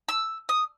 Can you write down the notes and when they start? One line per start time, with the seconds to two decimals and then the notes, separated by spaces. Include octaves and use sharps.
0.08 E6
0.49 D#6